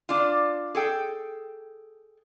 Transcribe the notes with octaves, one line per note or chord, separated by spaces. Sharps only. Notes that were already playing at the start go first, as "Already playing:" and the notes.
D4 F4
G#4 A4 G5